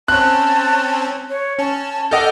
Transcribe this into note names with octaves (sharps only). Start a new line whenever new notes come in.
C4 C#4 A5 F#6
C#5
C#4 A5
A4 D#5 F#5 G5 D6 F6 G6